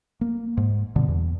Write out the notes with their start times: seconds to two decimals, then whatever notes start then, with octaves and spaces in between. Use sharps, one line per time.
0.21 A#3
0.57 G#2
0.96 G2 B2 D3
1.08 E2